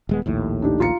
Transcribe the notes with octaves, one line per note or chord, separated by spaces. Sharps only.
D#1 G#3 B3
A#1 D#2 A2
D4 D#4 G4
F4 A#5 C#7